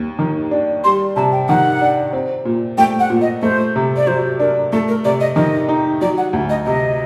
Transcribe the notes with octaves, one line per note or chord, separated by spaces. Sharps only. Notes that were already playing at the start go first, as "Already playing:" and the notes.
Already playing: D#2
D#3
D4
G3 C6
C3 A5
G5
D#3 F#5
D4
C4
A#2
A3 G5
F#5
A#2
D#5
A3 C5
C3
D5
F#3 C5
D4 A#4
A3 A4
A#4
C3 D5
D#5
D#3 D#5
D#4
F#3 D5
F#5
D2
D#5
C3 D#5